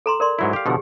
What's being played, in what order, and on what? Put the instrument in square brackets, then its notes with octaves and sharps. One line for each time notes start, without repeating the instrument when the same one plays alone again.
[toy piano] A4 A#5 C6
A#4 D5 C6
[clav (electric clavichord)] G#2 F#3 E4
G4 F5
[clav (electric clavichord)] B2 D3 F3 [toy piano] G4 G#4